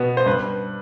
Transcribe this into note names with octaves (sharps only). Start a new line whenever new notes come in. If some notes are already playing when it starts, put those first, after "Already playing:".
Already playing: B2 B3
C5
G2 B4